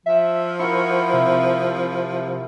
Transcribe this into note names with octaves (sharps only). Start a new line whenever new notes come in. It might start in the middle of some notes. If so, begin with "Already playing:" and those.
F3 E5
E4 F#4 A#4 C#6
C3 E5